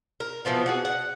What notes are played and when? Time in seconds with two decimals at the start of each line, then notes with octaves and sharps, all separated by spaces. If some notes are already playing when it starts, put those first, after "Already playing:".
0.20 A#4
0.45 B2 E3 F3 B3
0.66 F#4 G#4 F#5
0.85 F#5